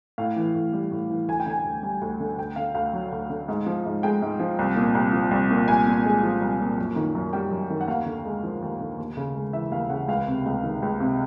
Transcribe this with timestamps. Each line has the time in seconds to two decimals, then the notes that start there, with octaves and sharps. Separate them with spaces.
0.18 A2 F5
0.36 E3
0.55 A2
0.73 G3
0.91 A2
1.10 E3
1.28 D2 G#5
1.40 G5
1.46 D3 G#5
1.65 D2
1.83 G3 G#5
2.01 D2
2.20 D3
2.38 D2 G5
2.56 D3 F5
2.75 D2 F5
2.93 F#3
3.12 D2
3.30 D3
3.48 G#2
3.66 F3
3.85 G#2
4.03 G#3 G5
4.22 G#2
4.40 F3
4.59 C2
4.76 A#2
4.95 C2
5.13 F3
5.31 C2
5.51 A#2
5.68 C2 G#5
5.87 A#2
6.06 G#3
6.23 F3
6.42 C2
6.60 A#2
6.78 F#2
6.96 D#3
7.15 F#2
7.33 G3 G5
7.51 F#2
7.70 D#3
7.81 F#5
7.88 D#2 F5
8.06 D3
8.26 G#3
8.43 F3
8.62 D#2
8.80 D3
8.98 D#2
9.17 C#3
9.35 G#3
9.53 E3 E5
9.71 D#2 F5
9.90 C#3 F#5
10.08 C#2 F5
10.27 C3
10.46 C#2
10.63 D#3
10.82 C#2
11.00 C3